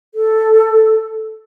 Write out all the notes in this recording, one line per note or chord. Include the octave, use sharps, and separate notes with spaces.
A4